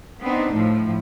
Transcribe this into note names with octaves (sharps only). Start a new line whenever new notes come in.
B3 C4 D4 D#4
A2 F3